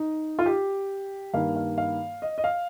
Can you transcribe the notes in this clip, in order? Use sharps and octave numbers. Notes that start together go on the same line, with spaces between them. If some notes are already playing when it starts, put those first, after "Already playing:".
Already playing: D#4
F4
G4
G2 D#3 A#3 F5
F5
F5
D#5
D#5
F5